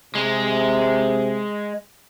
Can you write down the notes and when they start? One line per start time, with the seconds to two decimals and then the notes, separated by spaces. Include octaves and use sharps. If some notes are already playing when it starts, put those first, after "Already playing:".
0.15 C3 G#3